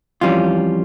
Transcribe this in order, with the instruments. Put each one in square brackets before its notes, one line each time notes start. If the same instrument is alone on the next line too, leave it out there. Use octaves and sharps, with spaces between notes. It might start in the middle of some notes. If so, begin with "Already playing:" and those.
[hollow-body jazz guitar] F2 E3 G3 C#4 F4